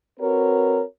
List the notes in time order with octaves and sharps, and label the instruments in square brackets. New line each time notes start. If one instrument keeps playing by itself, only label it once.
[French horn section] C4 F#4 A#4 B4 C#5